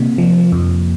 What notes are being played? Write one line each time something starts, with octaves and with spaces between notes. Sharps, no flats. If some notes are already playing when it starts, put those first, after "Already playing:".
Already playing: C3 A#3
F3
F2